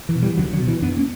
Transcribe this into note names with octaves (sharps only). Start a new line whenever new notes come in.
E3
B2
E3 G3
C#2 D3 F#3
D3 F#3
B2
E3
F#2 B3 D4
A#3 C#4